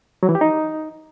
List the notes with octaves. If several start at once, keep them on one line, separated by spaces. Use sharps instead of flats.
F#3
E3
G4
D#4